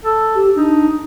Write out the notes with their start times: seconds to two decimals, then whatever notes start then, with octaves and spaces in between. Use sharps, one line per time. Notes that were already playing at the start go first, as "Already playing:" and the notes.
0.05 A4
0.35 G4
0.56 D4 D#4